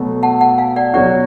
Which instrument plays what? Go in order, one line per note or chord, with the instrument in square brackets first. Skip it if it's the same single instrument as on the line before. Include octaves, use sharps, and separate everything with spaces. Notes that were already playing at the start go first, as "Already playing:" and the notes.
Already playing: [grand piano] B2 F#3 A3
[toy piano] F#5 A5
F#5 A5
F5 G#5
D5 F#5
[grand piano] B2 F#3 C#4 F#4 [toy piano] D5 F#5